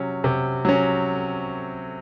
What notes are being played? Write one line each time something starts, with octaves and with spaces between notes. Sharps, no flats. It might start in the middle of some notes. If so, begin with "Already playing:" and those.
Already playing: C3 F#3 C#4
C3
F#3 C#4